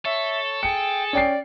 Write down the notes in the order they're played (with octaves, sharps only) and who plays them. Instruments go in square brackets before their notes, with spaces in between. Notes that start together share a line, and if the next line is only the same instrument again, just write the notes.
[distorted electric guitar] A4 [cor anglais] C#5 [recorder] E5
[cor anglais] G#4 [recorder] G5 [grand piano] C#7
[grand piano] C#4 G5 C7 [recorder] D5